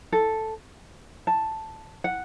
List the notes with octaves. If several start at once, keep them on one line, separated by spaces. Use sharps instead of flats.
A4
A5
F#5